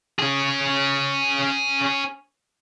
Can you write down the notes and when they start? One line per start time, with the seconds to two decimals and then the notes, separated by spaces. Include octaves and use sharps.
0.19 C#4 G#4